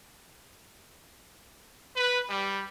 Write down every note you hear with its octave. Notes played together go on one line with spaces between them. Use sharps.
B4
G3